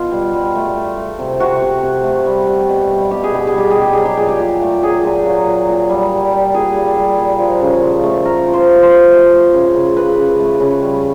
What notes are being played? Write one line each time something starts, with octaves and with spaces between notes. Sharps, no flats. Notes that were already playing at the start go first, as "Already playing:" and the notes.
Already playing: B2 F4
G3
G3
A3
A3
A3
C3
C3 F#4
C3
C3
A3
G3
G3
B2
G3
B2 G4
G#4
B2 G4
G#4
G3 G4
G#4
B2
G4
F#3 G#4
G4
A#2 G#4
G4
A#2
A3
F#3 G#4
A#2
F#3
A#2
A#2
G3
G3
G3
A#2 G#4
G3
G3
A#2
F3
C#3
F3
A3
F3 A#4
F3
C5
A3
C5
A3
A3
A3
C#3
C#3
C#3 B4
C#3
A3
C#3
G3